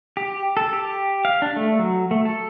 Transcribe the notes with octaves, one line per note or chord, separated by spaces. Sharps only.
G4
A4
G4
F5
D4
A3
F#3
A3
A4